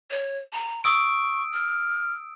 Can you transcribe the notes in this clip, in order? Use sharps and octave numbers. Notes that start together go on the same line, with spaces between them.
C#5
A#5
C#6 D#6 E6 D7
F6